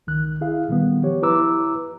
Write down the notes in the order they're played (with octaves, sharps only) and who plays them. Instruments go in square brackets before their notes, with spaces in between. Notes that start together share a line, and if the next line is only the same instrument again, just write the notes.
[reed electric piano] C#2 D#3 F#6
E4 G#4 F5
A#2 D#3 G3 B3
F3 G4 C#5
E4 B4 A#5 D6 E6